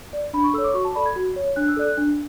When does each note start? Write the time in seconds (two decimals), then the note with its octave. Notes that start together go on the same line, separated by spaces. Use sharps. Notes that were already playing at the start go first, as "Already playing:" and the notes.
0.13 D5
0.33 D4 B5
0.44 C#6
0.54 A4 E6
0.58 C#5
0.64 D6
0.74 F#4 C#6
0.85 A5
0.95 A4 D5 B5
1.06 G#6
1.16 F#4
1.36 C#5
1.56 D4 F#6
1.68 E6
1.77 A4 D5 F#6
1.97 D4